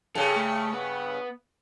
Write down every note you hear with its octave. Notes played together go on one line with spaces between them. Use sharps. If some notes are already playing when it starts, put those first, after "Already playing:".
G2 C#3 G#4 A4
A3
B3